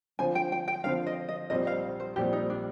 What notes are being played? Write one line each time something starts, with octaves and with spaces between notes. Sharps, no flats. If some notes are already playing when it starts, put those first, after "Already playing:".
D3 F3 C4 F4 C5 G#5
G5
G5
G5
D3 F3 C4 F4 C5 F5
D#5
D#5
A#1 A#2 G3 C4 D#5
F5
C5
A#1 A#2 G3 C4 G4
D#4
D4